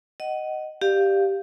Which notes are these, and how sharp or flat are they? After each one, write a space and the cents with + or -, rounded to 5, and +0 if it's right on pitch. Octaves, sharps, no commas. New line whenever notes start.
D#5 -5 F#5 +25
G4 +0 D5 +35 F5 +0